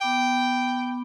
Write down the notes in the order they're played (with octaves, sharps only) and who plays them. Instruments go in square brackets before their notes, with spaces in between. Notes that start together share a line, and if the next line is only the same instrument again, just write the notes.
[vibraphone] B3 B5 D6 [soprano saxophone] G5